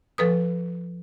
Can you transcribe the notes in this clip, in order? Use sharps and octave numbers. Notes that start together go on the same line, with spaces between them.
F3 A4 B4 D#6